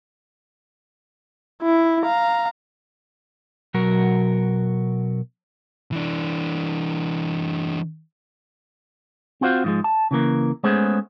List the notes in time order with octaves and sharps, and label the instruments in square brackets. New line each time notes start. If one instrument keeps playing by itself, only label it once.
[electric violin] E4
F5 A#5
[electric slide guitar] B2 F#3 F#4 A#4
[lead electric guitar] E3 D4
[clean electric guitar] C4 F4 F#4 C5 F5
G#2 F3 G#3
A5
C#3 E3 A#3
G#3 A3 B3 C#4 G#4 C5